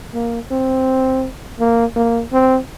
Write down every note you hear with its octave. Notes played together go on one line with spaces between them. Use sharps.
A#3
C4
A#3
A#3
C4